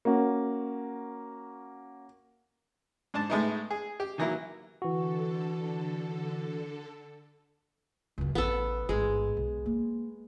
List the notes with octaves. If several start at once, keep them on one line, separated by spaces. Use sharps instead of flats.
A#3 C#4 F#4
G#2 D4 A5
A2 G#3 A3 B3 D#4
G#4
G4
D#3 E3 F#3 A#3 E4
D3 E3 F#4 A4
C#2 F#2
A1 B3 A4
A1 G#2 G#3
B1
A#3